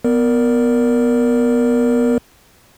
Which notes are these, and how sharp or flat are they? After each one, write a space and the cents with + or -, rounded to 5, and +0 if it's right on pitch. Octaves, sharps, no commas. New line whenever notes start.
B3 +0 A#4 +0 D5 +0